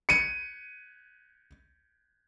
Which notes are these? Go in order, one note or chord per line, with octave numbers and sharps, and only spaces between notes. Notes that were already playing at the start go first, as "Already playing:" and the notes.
C#7 D#7